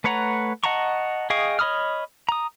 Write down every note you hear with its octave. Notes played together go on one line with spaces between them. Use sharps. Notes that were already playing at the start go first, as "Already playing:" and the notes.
A3 B4 C#5 F#5 A#5
D#5 F#5 A5 A#5 C#6
G#4 D#5 F5 G5 C#6
C#5 D#5 B5 D#6 F6
A#5 D#6